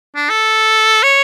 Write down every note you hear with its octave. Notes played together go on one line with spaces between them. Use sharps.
D4
A4
C#5